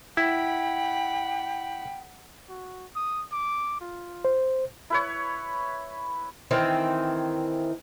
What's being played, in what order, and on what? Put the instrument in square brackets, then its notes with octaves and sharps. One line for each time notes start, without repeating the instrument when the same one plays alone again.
[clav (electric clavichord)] E4 [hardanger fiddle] F#5 B5 [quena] G5
[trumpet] F#4
D#6
D6
F4
[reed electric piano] C5
[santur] E4 B4 C#5
[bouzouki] D#3 E3 C4